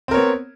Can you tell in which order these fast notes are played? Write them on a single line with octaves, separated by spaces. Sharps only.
C4 A#4 C#5 B3